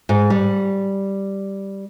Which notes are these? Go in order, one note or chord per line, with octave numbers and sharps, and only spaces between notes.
G#2
G3